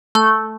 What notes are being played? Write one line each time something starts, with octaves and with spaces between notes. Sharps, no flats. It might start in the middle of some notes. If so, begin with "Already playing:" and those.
A3